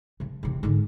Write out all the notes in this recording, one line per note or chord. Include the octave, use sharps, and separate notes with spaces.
C3 F3
E2 C3
G#2 D3